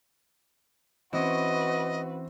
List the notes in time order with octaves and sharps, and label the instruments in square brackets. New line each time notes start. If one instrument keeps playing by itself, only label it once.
[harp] E3 C#4 [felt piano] C4 [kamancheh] F#4 B4 [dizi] D#5